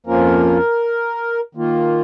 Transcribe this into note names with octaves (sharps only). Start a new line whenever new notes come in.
F2 F3 A#3 C#4 F4 A#4
D#3 A#3 F4